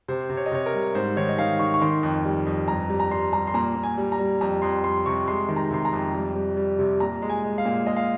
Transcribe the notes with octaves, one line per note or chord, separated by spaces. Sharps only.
C3 C5
C3
C#5
D#5
C3 C#5
A#4
G3
G#2 C5
D#3 C#5
D#5
D#3 F5
D#3 C#6
C#6
D#3 C6
F2
G3
F2
G2 A#5
G3
A#5
G3 C6
G3 A#5
C6
A#2 A#5
A#2
G#5
G3
A#5
G3
F2 A#5
F2 C6
G3 C6
C3 C#6
G#3 C6
D#3
A#5
C3 C6
A#5
F2
G3
G3
G3
C3
A#2 A#5
G#3
G#5
G#3
F5
A#2
G#3 D#5
F5